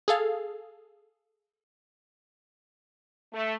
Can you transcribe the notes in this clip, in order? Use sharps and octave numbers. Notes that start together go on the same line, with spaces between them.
G#4 A4 F5
A3